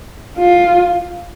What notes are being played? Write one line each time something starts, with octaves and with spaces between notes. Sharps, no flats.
F4